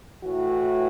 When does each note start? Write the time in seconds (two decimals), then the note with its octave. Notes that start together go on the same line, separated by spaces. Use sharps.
0.24 A2 E3 F#4